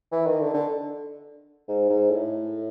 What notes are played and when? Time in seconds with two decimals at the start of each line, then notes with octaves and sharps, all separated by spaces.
0.12 E3
0.26 D#3
0.41 D3
0.54 D3
1.68 G#2
1.89 G#2
2.10 A2